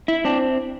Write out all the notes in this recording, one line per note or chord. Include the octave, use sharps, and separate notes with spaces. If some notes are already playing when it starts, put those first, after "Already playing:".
E4
C4 D4